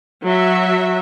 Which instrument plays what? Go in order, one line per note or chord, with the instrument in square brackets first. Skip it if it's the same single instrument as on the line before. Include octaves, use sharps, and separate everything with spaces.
[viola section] F#3 F#4 E5